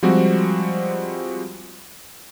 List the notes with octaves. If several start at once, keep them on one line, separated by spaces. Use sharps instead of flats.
F3 G3 G#3 C4 F#4